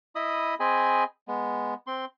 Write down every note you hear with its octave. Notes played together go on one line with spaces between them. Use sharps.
E4 D#5 B5 D#6
C4 G#4 D#5 G#5 B5
G#3 B3
C4 C6